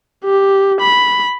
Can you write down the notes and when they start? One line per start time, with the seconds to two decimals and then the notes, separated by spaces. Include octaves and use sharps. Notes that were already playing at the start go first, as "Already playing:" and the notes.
0.24 G4
0.80 B5